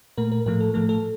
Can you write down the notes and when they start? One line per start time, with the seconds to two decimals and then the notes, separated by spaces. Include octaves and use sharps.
0.18 A#2 A3 A#4
0.32 A#4
0.46 A2 F3 A3 A#4
0.61 A4
0.74 A2 F3 A3 A4
0.89 A4